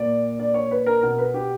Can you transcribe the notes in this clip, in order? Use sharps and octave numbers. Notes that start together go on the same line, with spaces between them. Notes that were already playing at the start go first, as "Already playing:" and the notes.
Already playing: A#2 D5
D5
C#5
B4
A#4
B2 A#4
B4
G4